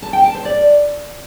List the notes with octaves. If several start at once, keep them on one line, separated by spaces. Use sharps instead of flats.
A5
G5
A5
C5
D5